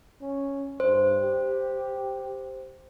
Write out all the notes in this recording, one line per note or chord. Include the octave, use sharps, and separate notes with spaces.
C#4
G2 C5
G4